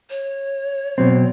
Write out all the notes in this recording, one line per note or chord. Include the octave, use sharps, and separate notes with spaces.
C#5
B2 F#3 C4